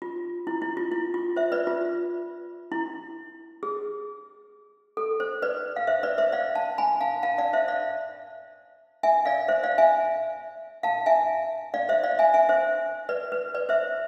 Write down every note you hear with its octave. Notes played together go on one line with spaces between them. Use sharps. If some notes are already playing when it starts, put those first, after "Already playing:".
F4
E4
E4
F4
E4
F4
C5 E5
B4 D5
F4
E4
G#4
A4
C5
B4 D5
F5
C5 E5
B4 D5
C5 E5
D5 F5
F5 A5
G#5 B5
F5 A5
F5 A5
D5 F5
C5 E5
D5 F5
E5 G#5
D5 F5
C5 E5
D5 F5
E5 G#5
F5 A5
E5 G#5
D5 F5
C5 E5
D5 F5
E5 G#5
E5 G#5
C5 E5
B4 D5
B4
B4 D5
C5 E5